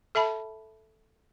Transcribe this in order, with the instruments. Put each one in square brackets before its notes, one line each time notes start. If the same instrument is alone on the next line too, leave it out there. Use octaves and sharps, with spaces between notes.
[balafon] A4 E5 A5 B5